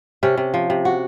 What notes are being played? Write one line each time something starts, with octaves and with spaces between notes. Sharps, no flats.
C3 C#4
C3
F3
C3
F#4